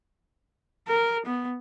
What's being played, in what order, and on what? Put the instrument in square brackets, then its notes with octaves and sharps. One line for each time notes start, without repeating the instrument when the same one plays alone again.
[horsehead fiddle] A#4
B3